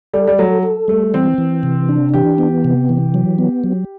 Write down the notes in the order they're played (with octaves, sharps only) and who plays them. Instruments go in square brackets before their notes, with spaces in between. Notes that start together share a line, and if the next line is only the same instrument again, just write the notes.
[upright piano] G3 [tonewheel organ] A4
[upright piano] G3
[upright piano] F#3 [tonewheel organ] A4
[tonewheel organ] A4
[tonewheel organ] G3 [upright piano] A3
[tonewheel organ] E3 [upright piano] C4
[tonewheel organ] E3
C3
D4
[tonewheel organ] E3 [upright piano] G4
[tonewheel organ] B3
C3
E3
F#3
B3
F#3